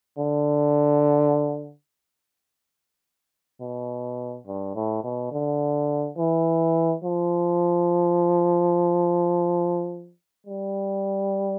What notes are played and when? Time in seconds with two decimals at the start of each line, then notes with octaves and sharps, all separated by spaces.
0.18 D3
3.61 B2
4.47 G2
4.75 A2
5.04 B2
5.32 D3
6.18 E3
7.04 F3
10.46 G3